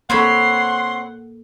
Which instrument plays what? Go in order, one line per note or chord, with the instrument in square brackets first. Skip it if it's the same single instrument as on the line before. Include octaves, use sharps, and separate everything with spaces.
[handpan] A#3 A4 [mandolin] C4 C#5 B5 [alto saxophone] F#5 [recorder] C6